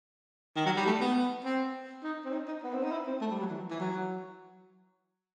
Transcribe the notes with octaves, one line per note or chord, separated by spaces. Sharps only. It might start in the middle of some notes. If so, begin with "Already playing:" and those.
D#3
F#3
G3
A3
B3
C4
D#4
C4
D#4
D#4
B3
C4
D#4
E4
C4
A3
G3
F#3
E3
E3
F#3